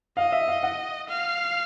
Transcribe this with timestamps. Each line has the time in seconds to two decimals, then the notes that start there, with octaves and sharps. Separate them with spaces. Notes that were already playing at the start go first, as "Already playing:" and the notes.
0.17 D#5 F5
0.32 E5
0.48 F5
0.63 F#5
1.09 F5